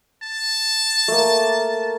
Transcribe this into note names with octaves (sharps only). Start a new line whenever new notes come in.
A5
A3 A#3